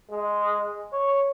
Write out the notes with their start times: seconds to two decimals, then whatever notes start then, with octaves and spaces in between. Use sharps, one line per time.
0.11 G#3
0.93 C#5